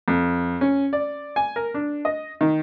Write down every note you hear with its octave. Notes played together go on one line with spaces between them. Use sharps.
F2
C#4
D5
G#5
A#4
D4
D#5
D#3